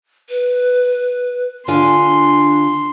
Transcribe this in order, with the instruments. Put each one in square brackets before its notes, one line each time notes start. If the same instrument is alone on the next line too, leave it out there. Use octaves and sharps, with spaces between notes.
[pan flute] B4
[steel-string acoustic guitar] D3 F4 G#5 [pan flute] D4 [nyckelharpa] C6